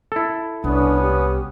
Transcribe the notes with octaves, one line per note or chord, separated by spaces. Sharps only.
E4 A4
C2 B3 C#4 D4 D#6
G4